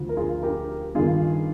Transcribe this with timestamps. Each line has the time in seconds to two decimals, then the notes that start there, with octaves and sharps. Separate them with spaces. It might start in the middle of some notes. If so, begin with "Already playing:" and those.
Already playing: D2 D3 F3
0.09 A#4
0.17 F4 G#4
0.43 G4 A#4
0.95 G2 D#3 F4 G#4